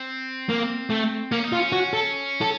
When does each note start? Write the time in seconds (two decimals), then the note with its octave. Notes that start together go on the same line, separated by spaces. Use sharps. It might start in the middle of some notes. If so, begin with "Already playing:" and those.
Already playing: C4
0.49 A#3
0.90 A3
1.31 A#3 C#4
1.44 D#4
1.52 F4
1.57 C#4
1.72 F#4
1.93 A4
2.41 A4